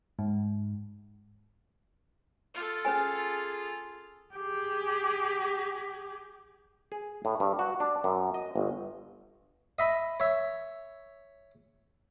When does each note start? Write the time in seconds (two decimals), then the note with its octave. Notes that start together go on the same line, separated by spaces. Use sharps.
0.19 G#2
2.54 F4 A4
2.85 C#4 G#4 B4 G#5
4.35 G4 G#4
6.92 G#4
7.25 A2
7.40 G2
7.59 F#4
7.80 D4
8.04 F#2
8.34 D#5
8.56 G1
9.79 D#5 E5 B5
10.20 C#5 E5